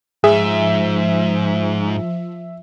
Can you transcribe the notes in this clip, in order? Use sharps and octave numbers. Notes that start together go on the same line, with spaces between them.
G#2 F3 G#4 E5